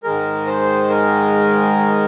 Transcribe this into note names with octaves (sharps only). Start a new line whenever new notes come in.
G#2 D#3 G#3 A#4
C5
A#4